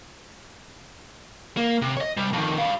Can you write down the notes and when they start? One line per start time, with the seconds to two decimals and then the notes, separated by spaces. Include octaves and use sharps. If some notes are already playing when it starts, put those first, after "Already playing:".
1.57 A#3
1.82 C3
1.97 C#5 D#5
2.17 C3 G3
2.33 F2 D#3
2.58 G3 F5